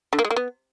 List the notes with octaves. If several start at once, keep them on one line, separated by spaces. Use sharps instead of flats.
D3
A#3
G#3
A#3
B3